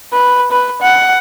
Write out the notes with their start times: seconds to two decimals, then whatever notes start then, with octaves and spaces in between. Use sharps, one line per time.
0.13 B4
0.51 B4
0.82 F#5